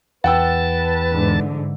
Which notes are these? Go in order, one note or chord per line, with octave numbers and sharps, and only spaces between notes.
E2 B4 F#5 G5 A5 E6
G#2 D3 E3